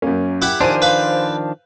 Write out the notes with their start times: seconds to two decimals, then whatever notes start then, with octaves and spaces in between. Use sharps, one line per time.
0.02 F#2 A#3 C#4
0.42 E4 G4 F#5
0.61 D#3 F3 D4 C5 G#5 D#7
0.82 B4 F5